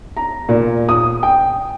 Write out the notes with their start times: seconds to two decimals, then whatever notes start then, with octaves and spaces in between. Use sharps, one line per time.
0.17 A#5
0.49 A#2
0.89 D#6
1.23 G5